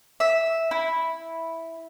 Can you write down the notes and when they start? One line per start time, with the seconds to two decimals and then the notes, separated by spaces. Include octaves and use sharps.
0.20 E5
0.71 E4